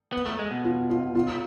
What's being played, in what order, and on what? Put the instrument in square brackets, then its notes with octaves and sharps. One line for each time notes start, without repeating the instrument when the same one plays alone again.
[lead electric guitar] B3
A3
G#3
B2
[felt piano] F4
F4
F4